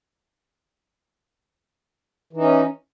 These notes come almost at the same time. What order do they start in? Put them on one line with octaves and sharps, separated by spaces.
E3 D#4 C#4